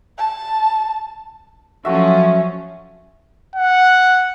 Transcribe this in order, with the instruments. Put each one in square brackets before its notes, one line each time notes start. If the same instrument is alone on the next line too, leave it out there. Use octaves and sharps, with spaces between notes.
[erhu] A5
[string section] F3 F#3 C#4 [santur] A3 F#4 E5
[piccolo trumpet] F#5